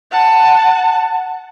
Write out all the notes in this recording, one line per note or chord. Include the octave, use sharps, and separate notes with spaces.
F#5 A5